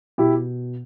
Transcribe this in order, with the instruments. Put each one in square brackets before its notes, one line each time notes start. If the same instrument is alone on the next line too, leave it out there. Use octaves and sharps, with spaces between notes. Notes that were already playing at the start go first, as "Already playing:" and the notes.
[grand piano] B2 E4 G4